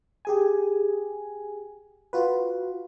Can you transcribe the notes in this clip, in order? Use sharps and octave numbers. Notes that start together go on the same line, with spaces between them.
G4 G#4 G#5
F4 F#4 B4